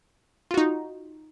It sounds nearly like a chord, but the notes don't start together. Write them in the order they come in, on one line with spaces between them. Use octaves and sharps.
F4 F#4 D#4